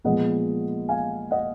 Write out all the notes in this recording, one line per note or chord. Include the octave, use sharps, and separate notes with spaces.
A#2 F3 G#3 B3 D#5 F#5
F5 G#5
D#5 F#5